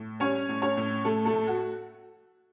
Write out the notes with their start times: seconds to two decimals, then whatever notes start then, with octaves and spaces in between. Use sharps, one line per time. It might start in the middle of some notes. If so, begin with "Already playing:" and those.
Already playing: A2
0.20 G3 C#4 C#5
0.49 A2
0.62 C#4 C#5
0.77 A2
1.04 A2 A3 A4
1.25 A3 A4
1.32 A2
1.47 F#4